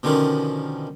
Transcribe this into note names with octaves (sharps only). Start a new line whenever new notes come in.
B2 D3 D#3 F3 C#4